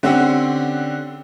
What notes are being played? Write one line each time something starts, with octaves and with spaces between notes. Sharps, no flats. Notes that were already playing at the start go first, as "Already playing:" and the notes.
D3 C4 C#4 G4 F#5